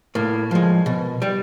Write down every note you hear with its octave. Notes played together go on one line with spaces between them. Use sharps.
A2 A#3
F3 G#3
B2
G3